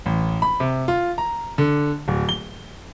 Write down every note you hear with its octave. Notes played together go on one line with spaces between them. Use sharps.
A1
B5
C3
F4
A#5
D3
D1
G7